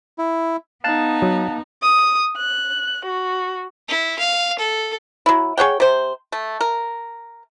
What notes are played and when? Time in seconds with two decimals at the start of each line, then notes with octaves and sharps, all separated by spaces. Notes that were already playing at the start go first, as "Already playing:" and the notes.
0.18 E4
0.84 B3 D#4 F5 A5 F#6
1.22 F#3
1.83 D#6
2.37 F#6
3.05 F#4
3.89 E4
4.19 F5
4.59 A4
5.26 F#3 E4
5.57 G#4 C#5 F#5 G5
5.80 C3 C5
6.32 A3
6.61 A#4